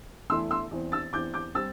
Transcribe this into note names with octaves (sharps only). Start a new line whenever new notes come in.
E2 E3 A3 E4 C6 E6
C6 E6
E2 E3 C4
E6 A6
E2 E3 C4 D6 G6
D6 G6
G3 C4 E6 A6